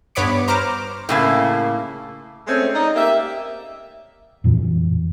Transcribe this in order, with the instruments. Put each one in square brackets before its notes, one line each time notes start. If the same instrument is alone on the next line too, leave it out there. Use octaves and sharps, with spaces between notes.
[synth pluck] G2 B3 C#5 B5 D6 C#7
C5 A#5 D6 F6
[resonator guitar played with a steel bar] A2 C#3 A#3
[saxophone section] G#3 A3 C4 C#4
D#4 D5 D#5
A#3 G4 E5
[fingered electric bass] F2 A#2 E3